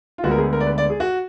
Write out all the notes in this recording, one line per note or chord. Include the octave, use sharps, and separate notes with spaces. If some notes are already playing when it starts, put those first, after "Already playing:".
F4
D2 D3 G#3 B3 F#4
A#4
G#4
A#4
D5
B4
D5
G#4
F#4